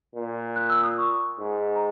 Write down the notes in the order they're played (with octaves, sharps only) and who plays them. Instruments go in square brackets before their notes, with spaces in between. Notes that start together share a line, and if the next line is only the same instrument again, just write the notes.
[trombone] A#2
[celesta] F#6
E6
D#6
C#6
[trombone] G#2
[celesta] A#5